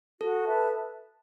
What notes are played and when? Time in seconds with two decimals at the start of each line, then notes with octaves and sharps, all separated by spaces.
0.21 F#4 A4
0.44 B4 E5 A5